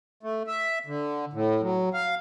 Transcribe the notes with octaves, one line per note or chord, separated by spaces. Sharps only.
A3
E5
D3
A2
F#3
F5